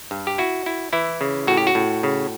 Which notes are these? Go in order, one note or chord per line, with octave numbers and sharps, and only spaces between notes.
G2
G4
E4 F#4
E4
E3 E4
C#3
A2 F#4
G4
F#4
A2
C#3